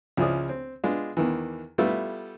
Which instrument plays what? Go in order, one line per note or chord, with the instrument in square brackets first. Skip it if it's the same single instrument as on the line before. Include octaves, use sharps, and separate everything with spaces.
[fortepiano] C#2 F3 E4 G#4 D5 D#6
C4
G#3 B3 D4 F4
E2 D#3 E3
G3 A3 B3 E4 F4 A4